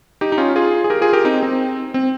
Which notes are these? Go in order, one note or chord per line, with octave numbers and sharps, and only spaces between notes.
D#4 G4
D#4
C#4 F4
F4 G#4
G#4
G4 A#4
F4 G#4
G4 A#4
C4 D#4
C4
C4